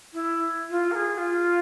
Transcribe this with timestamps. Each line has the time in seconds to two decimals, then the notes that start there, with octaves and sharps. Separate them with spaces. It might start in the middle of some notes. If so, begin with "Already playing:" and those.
0.13 E4
0.70 F4
0.92 A#4
0.95 G#4
1.14 G#4
1.18 F4